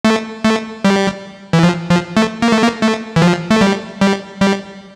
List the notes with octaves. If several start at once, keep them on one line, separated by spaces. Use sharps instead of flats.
A3
A3
G3
E3
F3
F3
A3
A#3
A3
A#3
A3
E3
F3
A3
G3
G3
G3